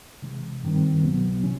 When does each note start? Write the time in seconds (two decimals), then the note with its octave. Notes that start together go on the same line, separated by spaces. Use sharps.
0.22 C3 E3 G#3
0.63 G2 D#3 G3 C4
1.04 C2 B2 F#3 B3
1.44 C3 E3 C#4